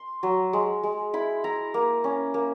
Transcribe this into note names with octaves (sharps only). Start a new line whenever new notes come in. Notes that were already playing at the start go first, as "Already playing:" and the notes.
Already playing: C6
F#3
G#3
G#3
E4 B5
E4 A#5
A#3
C#4
A#3